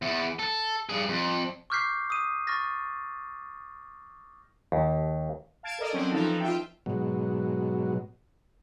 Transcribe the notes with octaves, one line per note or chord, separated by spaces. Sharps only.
E2
A4
G2 G#4
F2
C#6 D6 F6 G6 B6 C7
D#6 D#7
C#6 F6 A6 A#6
D#2
F5 A5 G#6 D7 E7
A4 A#4 D5 D#5
F#3 C4 C#4
E3 F3 D#4 A4
F4 E5 G5
G#2 B2 F#3